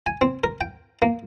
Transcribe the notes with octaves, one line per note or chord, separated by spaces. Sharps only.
G#5
C4
A#4
G5
A#3